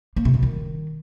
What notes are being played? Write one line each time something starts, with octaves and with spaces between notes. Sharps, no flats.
A#3
C3
B2
D#3